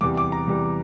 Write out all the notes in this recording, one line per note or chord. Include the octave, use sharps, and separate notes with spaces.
E2 C3 E3 G3 D6
D6
A#5
E2 C3 E3 G3